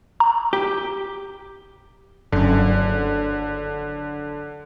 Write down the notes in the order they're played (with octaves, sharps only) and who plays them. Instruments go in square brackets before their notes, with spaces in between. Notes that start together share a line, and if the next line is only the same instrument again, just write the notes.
[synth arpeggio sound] A#5
[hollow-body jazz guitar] G4
[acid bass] F#1 [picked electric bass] G2 F#3 C#4 [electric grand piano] D3